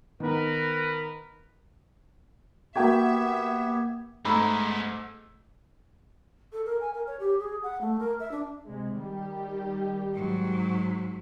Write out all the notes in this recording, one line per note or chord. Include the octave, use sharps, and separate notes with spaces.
D#3 B3 A#4 B4
A#3 B3 F#4 G4 E5 G5 G#6
G#2 G#3 A3 B3 A#5 B5 E6
A4
A#4
G#5
A#4
C#5
G4
G#4
F#5
A3
A#4
E5
D4
C3 G#3
D#3 G3 G4
G#2 F#3